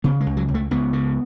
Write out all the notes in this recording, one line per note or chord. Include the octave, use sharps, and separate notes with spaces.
C#3 B3
G#3
C#2
F#3
C#2
A3
C#2 B3
C#3